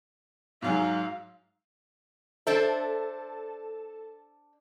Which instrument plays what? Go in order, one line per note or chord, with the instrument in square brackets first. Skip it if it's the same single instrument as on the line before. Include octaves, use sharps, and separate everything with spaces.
[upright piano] G#2 F#3 G#4 [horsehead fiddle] F5
[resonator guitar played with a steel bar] D4 C5 E5 [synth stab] A4 A5